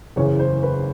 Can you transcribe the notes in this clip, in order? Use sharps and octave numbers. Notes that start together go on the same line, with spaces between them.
F#1 E2 C#3 E3 C#5
C5
B4